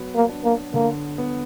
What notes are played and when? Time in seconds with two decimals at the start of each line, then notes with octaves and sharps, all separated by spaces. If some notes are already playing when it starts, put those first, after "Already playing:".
Already playing: F#3 B3
0.15 A#3
0.29 D4
0.45 A#3
0.74 D3 A#3
1.18 B3